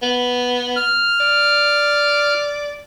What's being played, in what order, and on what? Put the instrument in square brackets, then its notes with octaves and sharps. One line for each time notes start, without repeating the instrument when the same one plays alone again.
[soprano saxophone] B3
[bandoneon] F6
[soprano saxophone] D5